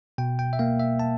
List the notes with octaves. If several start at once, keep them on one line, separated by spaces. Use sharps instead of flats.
B2 G5
G5
E5
A#3 F5
E5
A5